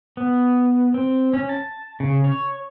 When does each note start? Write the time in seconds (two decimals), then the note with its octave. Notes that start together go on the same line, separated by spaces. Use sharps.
0.17 B3
0.94 C4
1.34 C#4
1.49 A5
2.00 C#3
2.24 C#5